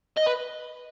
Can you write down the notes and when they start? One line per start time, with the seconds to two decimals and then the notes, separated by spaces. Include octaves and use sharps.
0.17 D#5
0.26 B4